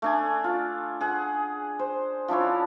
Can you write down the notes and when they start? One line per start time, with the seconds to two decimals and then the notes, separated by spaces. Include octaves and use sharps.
0.02 A3 D4 G#5
0.44 F4
1.01 G#4 F#5
1.79 C5
2.28 F3 D4 E4 C#5